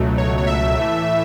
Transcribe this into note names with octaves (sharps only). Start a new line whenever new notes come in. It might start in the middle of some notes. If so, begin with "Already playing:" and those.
Already playing: C#2 B2 F#3 A3
C#5
C#5
E5
A2 E3 A3